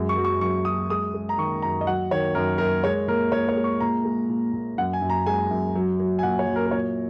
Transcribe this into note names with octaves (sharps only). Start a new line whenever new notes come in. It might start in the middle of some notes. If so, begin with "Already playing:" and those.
Already playing: F#2 G#3
C#6
F#3
C#6
F#2 C#6
F#3 D#6
G#3 D#6
G#3
A#5
D#3 C#6
F#2 A#5
D#5
F#3 F#5
D#3 C#5
F#2 A#4
F#2 A#4
G#3 C#5
A#2 A#4
A#2 C#5
C#5
G#3
C#6
A#2 A#5
G#3
A#2
A#2
F#2 F#5
G#5
F#2
A#5
G#3 G#5
F#2
F#3
F#3
G#5
A#2 F#5
C#5
F#3
A#4
A#4
A#2 C#5